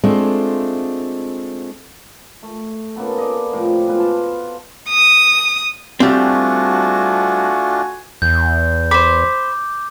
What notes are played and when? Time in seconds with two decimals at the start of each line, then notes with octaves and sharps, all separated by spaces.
0.04 G#3 A3 C4 D4 F4
2.43 A3
2.96 C#3 A#3 B3 A4
3.18 D5 D#5
3.52 A2 C3 F3 D6
3.87 B2 G#3 F4 B4
4.00 A5
4.89 D#6
6.00 G3 A3 C4 D4 F4 F#4 G#5
8.22 E2 G6
8.91 C5 B5 D6